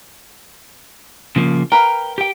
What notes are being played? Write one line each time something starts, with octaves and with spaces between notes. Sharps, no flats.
C#3 F3 A#3
A#4 B4 F5 G5
G4 G5